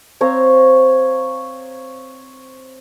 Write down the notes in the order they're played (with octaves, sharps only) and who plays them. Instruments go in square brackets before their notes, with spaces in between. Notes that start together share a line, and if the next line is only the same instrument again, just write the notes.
[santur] C4 C#5 F5 A#5